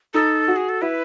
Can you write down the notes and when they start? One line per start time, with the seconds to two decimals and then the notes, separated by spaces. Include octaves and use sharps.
0.14 D#4 A4
0.48 F#4
0.56 G#4
0.69 A4
0.82 E4 B4